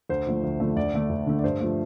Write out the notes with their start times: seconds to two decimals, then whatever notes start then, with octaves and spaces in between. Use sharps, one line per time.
0.09 D2 C5
0.26 D3 F3 A3
0.44 D2
0.60 D3 F3 A3
0.76 D2 D5
0.93 D3 A3
1.10 D2
1.27 D3 A3
1.39 D5
1.44 G2 C5
1.61 F3 A3